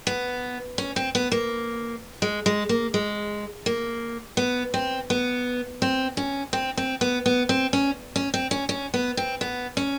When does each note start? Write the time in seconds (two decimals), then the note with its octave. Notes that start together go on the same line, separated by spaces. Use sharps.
0.07 B3
0.78 C#4
0.96 C4
1.15 B3
1.32 A#3
2.22 G#3
2.46 G#3
2.69 A#3
2.94 G#3
3.66 A#3
4.37 B3
4.74 C4
5.10 B3
5.82 C4
6.17 C#4
6.53 C4
6.77 C4
7.01 B3
7.26 B3
7.49 C4
7.73 C#4
8.16 C#4
8.34 C4
8.51 C#4
8.69 C#4
8.94 B3
9.17 C4
9.41 B3
9.77 C#4